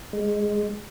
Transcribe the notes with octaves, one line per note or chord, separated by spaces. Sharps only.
G#3